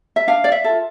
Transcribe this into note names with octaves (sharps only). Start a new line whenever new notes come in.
E5
D4 F5
D5
E5
F4 A4